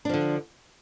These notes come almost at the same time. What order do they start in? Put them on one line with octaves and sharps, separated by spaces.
D4 F3 D3